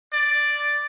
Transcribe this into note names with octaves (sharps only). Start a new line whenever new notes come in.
D5